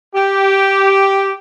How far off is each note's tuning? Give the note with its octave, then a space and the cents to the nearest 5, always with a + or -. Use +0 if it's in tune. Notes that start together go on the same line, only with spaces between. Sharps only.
G4 -5